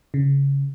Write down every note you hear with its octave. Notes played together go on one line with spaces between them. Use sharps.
C#3